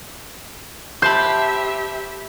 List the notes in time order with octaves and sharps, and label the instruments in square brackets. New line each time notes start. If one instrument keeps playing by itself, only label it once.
[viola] G4 E5 [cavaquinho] C5 A5 B5 [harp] G6